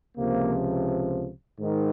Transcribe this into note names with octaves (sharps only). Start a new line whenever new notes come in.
C#2 C3 F3 A#3
G#2 D#3